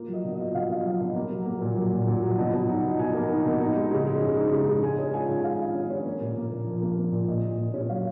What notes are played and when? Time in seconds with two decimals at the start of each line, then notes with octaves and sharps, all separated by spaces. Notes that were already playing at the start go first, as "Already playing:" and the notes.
Already playing: A#3 F4
0.08 F#3
0.13 D#5
0.24 B2
0.34 D#5
0.39 F4
0.54 B2 F5
0.70 F4
0.85 F#3
1.01 B2
1.16 A#3
1.30 F#3
1.46 A#3
1.61 A#2
1.77 F#3
1.92 A#2
2.07 A#2
2.23 F#3
2.38 B2
2.54 B2
2.69 D#4
2.84 B2
2.99 B2 G#5
3.14 A#3
3.29 D#4
3.45 B2
3.61 D#4
3.76 G#3
3.91 C#3
4.07 G#3
4.22 C#3
4.37 D#4
4.53 C#3
4.67 C#3
4.83 G#3 G#5
4.98 C#4
5.14 F4 G#5
5.29 D#3
5.44 F4 F5
5.59 F4
5.75 C#4
5.90 C#4
6.06 A#3
6.21 A#2
6.37 A#3
6.51 A#2
6.67 F3
6.82 A#3
6.97 A#3
7.12 A#2
7.28 A#2 D#5
7.43 A#2
7.59 A#2
7.74 C#4
7.89 F#3 F5